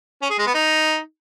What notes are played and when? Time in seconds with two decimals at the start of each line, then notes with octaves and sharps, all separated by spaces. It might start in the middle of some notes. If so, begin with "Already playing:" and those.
0.22 C#4
0.30 G#4
0.38 G#3
0.46 B3
0.55 D#4